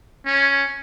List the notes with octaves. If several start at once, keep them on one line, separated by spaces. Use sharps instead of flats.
C#4